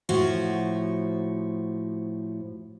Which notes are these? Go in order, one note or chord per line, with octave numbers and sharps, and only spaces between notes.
A2 F3 F#4